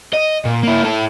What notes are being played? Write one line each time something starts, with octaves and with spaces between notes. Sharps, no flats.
D#5
A#2
A#3 E4
E4 A4